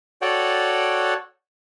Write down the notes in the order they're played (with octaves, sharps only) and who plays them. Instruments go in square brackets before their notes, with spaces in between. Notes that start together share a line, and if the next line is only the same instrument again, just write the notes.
[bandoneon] F#4 A4 C#5 D5 F#5 G5